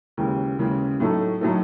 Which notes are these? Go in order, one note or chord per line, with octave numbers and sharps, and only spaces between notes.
D#2 C#3 E3 G#3
D#2 C#3 E3 G#3
A2 F#3 A3 D#4 A4
A2 F#3 A3 D#4 A4